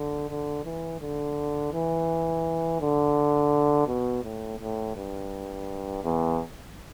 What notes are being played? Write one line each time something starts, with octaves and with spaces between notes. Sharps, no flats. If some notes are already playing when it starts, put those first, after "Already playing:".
Already playing: D3
D3
E3
D3
E3
D3
B2
A2
A2
G2
E2